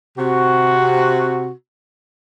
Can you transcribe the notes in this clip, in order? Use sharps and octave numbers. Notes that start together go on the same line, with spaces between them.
C3 F#4